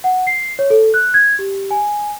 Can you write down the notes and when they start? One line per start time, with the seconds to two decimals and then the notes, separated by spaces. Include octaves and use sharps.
0.04 F#5
0.27 C7
0.59 C#5
0.70 A4
0.94 F#6
1.14 G#6
1.39 G4
1.71 G#5